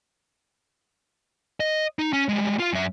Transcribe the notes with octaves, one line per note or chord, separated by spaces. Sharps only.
D#5
D#4
C#4
G3 G#3
F4 F5
F#2 E5